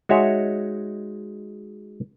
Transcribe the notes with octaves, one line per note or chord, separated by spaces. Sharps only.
G#3 D#4 F#4 C#5 E5